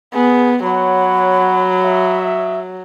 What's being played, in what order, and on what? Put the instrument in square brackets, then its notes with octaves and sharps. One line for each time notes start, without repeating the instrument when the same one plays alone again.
[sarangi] B3 [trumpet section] G#4
[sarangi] F#3 [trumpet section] C#5 F#5 [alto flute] B5
[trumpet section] C#5 D#5 E5